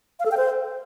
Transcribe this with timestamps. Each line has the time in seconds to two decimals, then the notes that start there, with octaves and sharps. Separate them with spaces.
0.20 F5
0.25 A4
0.31 G5
0.37 C5